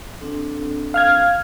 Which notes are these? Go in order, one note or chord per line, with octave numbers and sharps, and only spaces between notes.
C4 D4 A4
F5 F6 G#6